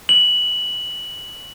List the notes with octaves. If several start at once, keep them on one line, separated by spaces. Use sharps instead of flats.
F#7